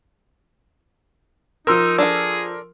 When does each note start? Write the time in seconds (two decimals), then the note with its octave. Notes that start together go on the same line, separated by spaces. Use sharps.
1.67 F3 D#4 A#4 C6 E6
1.98 D4 G#4 A4